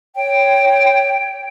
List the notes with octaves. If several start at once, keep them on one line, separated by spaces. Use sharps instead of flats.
C#5 G5